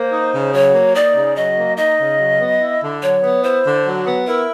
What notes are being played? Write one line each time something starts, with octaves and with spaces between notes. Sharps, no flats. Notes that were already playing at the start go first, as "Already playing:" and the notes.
Already playing: A#3 C5
D#4
C#3
F#3 C#5
A#3
D#4 D5
C#3
F#3 D#5
A#3
D#4 D#5
C#3
F#3
B3
E4
D3
F#3 C#5
B3
E4 C5
D3
F#3
B3
E4 A#4